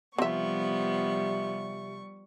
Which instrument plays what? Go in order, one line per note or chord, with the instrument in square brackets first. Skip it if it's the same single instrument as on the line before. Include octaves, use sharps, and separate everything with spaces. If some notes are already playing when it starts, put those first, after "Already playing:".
[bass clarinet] C3 [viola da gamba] F3 B3 [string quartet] G3 C#6 [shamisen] C4 E5